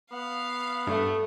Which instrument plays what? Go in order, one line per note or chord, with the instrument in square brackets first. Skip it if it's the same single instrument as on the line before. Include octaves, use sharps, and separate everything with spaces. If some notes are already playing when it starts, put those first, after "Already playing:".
[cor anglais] B3 [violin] F5
[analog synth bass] G2 [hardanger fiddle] A3